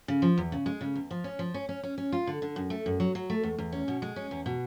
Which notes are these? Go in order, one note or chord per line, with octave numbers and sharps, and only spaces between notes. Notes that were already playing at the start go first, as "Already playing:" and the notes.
C#3
F3
E2
C#3
G#3
C#3
E2
F3
C#4
F3
C#4
C#4
C#4
C#4
F4
D3
D3
F#2
A3
F#2
F#3
F#3
A3
E2
E2
C#4
B2
G#3
C#4
E2
B2